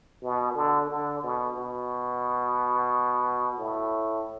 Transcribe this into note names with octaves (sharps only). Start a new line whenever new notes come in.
B2
D3
D3
B2
B2
A2